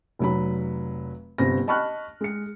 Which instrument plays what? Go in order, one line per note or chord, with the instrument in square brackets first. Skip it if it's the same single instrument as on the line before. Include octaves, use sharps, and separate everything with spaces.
[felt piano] F1 F#3 B5
G1 C3 C4 B5 A#6
D#5 A5 B5 C#6 F6 F#6
G#3 C#7